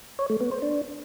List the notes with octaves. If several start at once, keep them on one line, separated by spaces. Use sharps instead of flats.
C#5
A3
B3
C5
D4